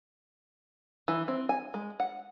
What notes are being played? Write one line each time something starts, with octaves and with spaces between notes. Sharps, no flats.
E3
C4
G#5
G#3
F#5